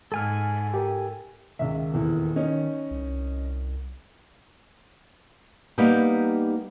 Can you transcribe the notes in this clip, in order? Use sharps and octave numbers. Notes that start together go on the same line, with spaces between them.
G#2 A4 G#5 F6
G4 A#4
C#2 D#3 E5
D#1 E2 E4
C#4 D#4
C2
G3 A#3 B3 D#4 G4